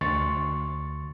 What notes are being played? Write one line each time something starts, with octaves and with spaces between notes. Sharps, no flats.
D2 C6 C#6 A6